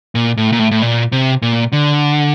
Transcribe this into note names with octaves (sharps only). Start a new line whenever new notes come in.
A#2
A2
A#2
A2
A2
A#2
C3
A#2
D3